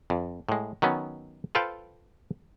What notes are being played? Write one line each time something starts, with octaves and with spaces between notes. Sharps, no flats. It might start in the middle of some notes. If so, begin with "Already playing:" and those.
F2
A2 G#3
D#3 F#3 B3 C#4
F4 A4 B4 C5 F5 G5